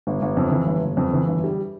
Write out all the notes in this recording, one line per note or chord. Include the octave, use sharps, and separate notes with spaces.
G1
G1
F2
E3
G1
G1
F2
E3
G1
G3